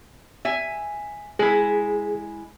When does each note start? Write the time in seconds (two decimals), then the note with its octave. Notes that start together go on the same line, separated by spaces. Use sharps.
0.45 E5 G#5
1.39 G#3 E4 G#4